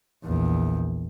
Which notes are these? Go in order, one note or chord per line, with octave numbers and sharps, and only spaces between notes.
A#1 E2